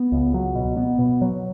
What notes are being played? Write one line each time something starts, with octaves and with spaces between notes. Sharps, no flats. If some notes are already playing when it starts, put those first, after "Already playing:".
Already playing: B3
C#2
F#3
B2
B3
B2
F#3